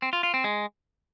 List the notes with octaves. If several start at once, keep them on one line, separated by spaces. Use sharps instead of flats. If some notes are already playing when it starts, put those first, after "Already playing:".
C4
F4
F4
C4
G#3